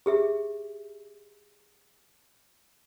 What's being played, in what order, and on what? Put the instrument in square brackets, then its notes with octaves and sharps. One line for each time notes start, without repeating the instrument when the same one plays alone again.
[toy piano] G4 G#4 E5